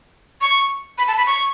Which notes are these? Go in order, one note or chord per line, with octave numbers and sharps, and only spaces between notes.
C#6
B5
A5
B5
C#6